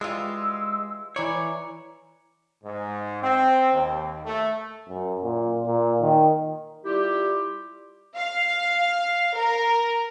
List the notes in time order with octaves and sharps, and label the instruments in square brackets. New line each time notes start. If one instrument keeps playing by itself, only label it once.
[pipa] E3 G3 F4 [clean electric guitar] G#3 [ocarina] E6
[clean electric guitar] E3 C#5 [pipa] E4 D5 [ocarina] A#5
[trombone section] G#2
C4
D#2
A3
[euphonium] F#2
A#2
A#2
D#3
[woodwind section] G3 E4 F4 G4
[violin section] F5
A#4